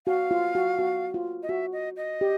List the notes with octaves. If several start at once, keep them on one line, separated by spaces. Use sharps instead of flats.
F#4 F5
F4
F#4
F#4
F4
D#5
F#4 E5
D#5
D#5
G4